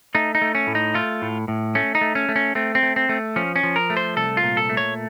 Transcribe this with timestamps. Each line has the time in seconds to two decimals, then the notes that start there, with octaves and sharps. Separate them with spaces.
0.15 A3 D#4
0.35 D#4
0.42 A3
0.55 C#4
0.67 A2
0.75 D#4
0.94 A3 F4
1.22 A2
1.48 A2
1.75 A3 C#4
1.95 D#4
2.01 A3
2.15 C#4
2.29 A3
2.36 C#4
2.55 A3 C4
2.75 C4
2.83 A3
2.96 C4
3.09 A3
3.36 F3 C#4
3.56 C#4
3.63 F3
3.76 A#4
3.90 A3
3.97 C5
4.17 C2 A4
4.37 F4
4.43 A#2
4.57 A4
4.69 A3
4.77 C#5